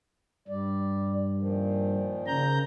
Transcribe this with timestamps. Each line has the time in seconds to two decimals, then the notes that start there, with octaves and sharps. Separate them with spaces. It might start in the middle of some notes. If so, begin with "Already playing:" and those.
0.48 G2 G3 D5
1.38 A#2 D#3 F3
2.27 C#3 A#5 G6